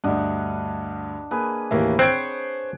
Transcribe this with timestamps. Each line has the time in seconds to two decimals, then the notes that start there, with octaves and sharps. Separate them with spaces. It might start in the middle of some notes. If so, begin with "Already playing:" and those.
0.04 D2 G2 D4 D#5 F#5
1.31 A#3 G#4 B4
1.71 D#2 A2 E3 A#3
1.99 C4 C5 C#5 F#6 G#6 D7